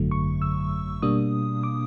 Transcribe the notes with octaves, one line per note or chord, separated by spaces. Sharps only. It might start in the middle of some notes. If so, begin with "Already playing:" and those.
Already playing: G#1 F#2 D3 F#3 A3
C#6
E6
B2 G3 A#3 D4 D#6
D6